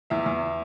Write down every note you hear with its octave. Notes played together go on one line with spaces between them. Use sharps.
E2 E5
E2